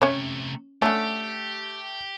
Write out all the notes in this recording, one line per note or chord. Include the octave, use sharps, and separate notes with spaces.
C3 A3 C#4 C#5
D3 A3 C#4 G4